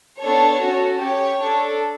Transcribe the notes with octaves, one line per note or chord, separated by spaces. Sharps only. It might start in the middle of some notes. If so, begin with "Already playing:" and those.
B3 D4 A4 C#5
C#4 F#4 A4
C#4 G4 C#5
D4 A4